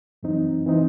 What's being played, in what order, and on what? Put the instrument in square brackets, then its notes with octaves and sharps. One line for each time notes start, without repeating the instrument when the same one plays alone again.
[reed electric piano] F#2 E3 C4 D#4
E3 C4 D#4